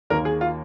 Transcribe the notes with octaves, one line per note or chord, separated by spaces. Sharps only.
D#2 D#3 A#3 A#4
G#4
F4